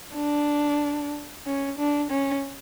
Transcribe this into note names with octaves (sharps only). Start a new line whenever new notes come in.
D4
C#4
D4
C#4